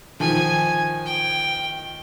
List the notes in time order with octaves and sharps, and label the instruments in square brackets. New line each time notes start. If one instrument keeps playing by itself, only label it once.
[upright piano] D#3 F3 [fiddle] G#5
[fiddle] G5